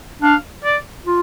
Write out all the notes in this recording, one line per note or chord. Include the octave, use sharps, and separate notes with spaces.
D4 F5
D5
F4